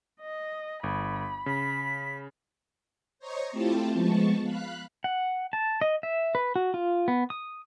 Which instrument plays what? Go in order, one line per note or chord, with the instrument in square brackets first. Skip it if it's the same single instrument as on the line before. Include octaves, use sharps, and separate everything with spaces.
[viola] D#5
[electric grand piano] G1 [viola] B5
[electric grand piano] C#3 [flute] B6
[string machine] C5 C#5 D#5 A#5 C#6
A3 C4 E4 F4 G4 A5
F3 G#3 B3 A5 C#6
F5 B5 F#6
[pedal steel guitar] F#5
A5
D#5
E5
B4
F#4
F4
B3
D#6